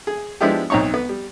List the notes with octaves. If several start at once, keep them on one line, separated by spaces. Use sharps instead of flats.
G#4
F3 G#3 B3 D4 E4 G4
B1 C4 D#4 C#5 C#6
B3
G3